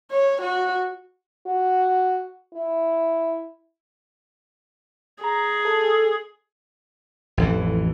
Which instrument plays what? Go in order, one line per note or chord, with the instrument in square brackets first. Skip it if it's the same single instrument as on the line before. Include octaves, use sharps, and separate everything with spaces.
[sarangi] C#5
F#4
[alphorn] F#4
E4
[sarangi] G#4 [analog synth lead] A#5
[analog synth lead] A4
[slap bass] A1 F2 E3